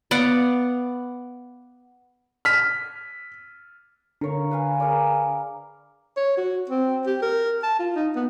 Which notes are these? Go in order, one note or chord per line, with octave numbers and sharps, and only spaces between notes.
B3 D5 F5 F#5
F6 B6
D3 A#4 C#5 F5
B4 F5 G#5
G#4 A#4 D5
C#5
F#4
C4
G4
A#4
A5
F4
D#4
B3